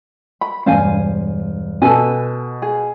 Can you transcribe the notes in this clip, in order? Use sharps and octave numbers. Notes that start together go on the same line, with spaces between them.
B5
E1 G2 C5 F5 G#5
B2 A4 B4 G#5
G#4